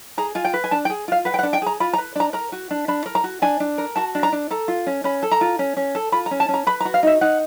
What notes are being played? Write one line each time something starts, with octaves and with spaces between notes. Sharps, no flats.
G#4 A#5
F4 G#5
G5
B4
G#5
D4 A5
G5
G#4
F4 F5
B4 F#5
G5
F#5
D4
G5
G#4 A#5
F4 B5
A#5
B4
D4 A#5
A#4 A#5
F#4
D4
D4 B5
A#4
A#5
F#4
D4 G#5
D4
A#4
F#4 A5
D4
A#5
D4
A4 A#5
F4
C#4
C#4 B5
A4
A#5
F4
C#4
C#4
A4
F4 B5
A#5
C#4
A5
C#4
A#5
B4 B5
A#5
F#4
F5
D#4 E5
D#4 F#5